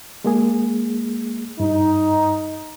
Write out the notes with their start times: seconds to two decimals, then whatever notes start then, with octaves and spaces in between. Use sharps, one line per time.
0.24 G#3 A#3 G#4
1.60 G2 D#4